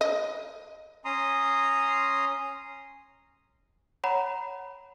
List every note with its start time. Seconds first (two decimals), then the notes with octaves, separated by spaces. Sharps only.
0.01 D#5
1.05 C#4 A#5 C6 D#6
4.04 C#5 F#5 A#5 B5